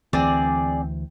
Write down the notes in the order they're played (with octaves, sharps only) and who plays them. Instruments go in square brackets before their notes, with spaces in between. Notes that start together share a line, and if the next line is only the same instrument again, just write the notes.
[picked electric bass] D2 E3 [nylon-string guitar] C4 [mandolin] G#4 D5